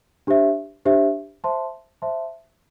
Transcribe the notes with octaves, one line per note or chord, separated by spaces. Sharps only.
D4 G4 C5 E5
D4 G4 C5 E5
C5 E5 A5 C6
C5 E5 A5 C6